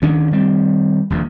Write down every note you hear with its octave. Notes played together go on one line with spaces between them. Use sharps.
D2 D#3 C#4 D4
D#3 G3 C4
D#1 A#1 E2